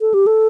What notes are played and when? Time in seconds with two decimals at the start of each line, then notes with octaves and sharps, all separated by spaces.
0.01 A4
0.14 G4
0.27 A4